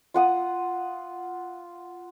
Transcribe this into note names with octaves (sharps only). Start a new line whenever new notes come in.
F4 F#5 D#6